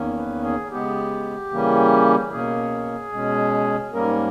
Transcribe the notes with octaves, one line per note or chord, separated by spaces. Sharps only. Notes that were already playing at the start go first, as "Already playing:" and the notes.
Already playing: E2 D#3 A#3 C#4
B4
G#4
C#3 G#3 B3 G4
C#3 E3 G3 A#3 C#4
B2 A#3 C#4 G#4
B2 G#3 C#4
G#2 G3 A#3 C#4 A#4